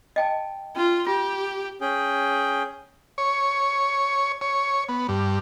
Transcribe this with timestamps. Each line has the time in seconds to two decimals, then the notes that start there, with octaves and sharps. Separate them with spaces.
0.16 D#5 G5 A5
0.76 C#4 F4
1.07 F4 G4
1.81 C#4 G#4 G5
3.18 C#5
4.41 C#5
4.89 B3
5.08 G2